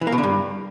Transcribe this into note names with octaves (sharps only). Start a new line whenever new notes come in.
E3
A#3
B2
D3
G2